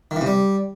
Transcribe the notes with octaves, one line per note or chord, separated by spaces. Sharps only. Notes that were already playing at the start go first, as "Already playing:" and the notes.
D#3
E3
C3
G3